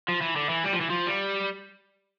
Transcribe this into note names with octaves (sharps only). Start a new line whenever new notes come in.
F3
E3
D3
E3
G3
F3
E3
F3
G3